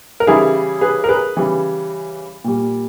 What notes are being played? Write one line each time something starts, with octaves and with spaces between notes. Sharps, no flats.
A#4
C#3 E3 G3 E4 G#4
G#4 B4
A#4
G#4 B4
C#3 E3 G3
A#2 G3